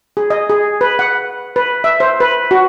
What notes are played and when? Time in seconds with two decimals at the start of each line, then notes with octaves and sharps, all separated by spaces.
0.17 G#4
0.30 D#5
0.50 G#4
0.81 B4
0.99 F#5
1.56 B4
1.84 E5
2.00 C5
2.20 B4
2.51 F#4